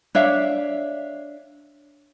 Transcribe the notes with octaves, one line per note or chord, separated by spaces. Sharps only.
D4 C#5 E5 F5